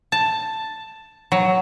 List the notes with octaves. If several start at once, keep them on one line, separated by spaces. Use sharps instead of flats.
A5
F#3